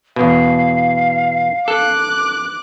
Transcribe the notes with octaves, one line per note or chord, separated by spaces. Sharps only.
E2 B2 F5
A4 D6 F#6